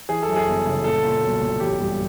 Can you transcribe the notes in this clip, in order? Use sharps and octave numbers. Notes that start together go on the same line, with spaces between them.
E3 G#4
A4
F#2
G#4
G1
C#3
A#2 A4
A#2
B1
B1
A1 G4
G2